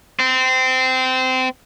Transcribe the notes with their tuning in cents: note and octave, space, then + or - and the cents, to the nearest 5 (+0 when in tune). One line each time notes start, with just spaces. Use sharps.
C4 -20